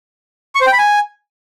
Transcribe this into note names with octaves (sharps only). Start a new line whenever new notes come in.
C#6
C5
G5
B5
G#5